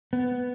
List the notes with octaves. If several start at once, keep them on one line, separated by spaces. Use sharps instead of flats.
B3